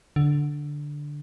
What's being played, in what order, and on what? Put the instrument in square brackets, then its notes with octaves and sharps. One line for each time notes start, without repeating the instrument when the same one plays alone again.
[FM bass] D3